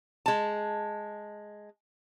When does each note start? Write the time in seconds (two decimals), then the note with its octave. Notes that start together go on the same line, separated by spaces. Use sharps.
0.26 G#3 A5